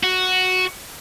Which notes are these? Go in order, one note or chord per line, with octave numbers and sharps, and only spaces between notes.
F#4